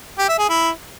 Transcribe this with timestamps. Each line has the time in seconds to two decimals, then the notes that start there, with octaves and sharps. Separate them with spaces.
0.19 G4
0.29 E5
0.39 G#4
0.49 E4